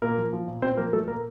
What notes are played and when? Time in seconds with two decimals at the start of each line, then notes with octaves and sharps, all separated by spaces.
0.02 A#2 A#3 A#4
0.17 F3
0.33 F3
0.48 A#2
0.62 A#2 C4 C5
0.77 F3 A#3 A#4
0.93 F3 A3 A4
1.08 A#2 A#3 A#4